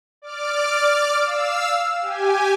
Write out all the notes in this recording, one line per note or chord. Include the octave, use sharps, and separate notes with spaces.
D5 D6 F6
F5 E6
G4 G#5